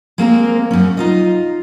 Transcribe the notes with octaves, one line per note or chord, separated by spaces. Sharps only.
G#3 A#3 C4 A#4
F#2 C#4
D#4 F4 D#5